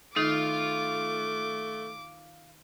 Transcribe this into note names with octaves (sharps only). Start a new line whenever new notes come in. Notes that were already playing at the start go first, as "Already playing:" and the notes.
D#3 A3 D#4 F4 F5 D6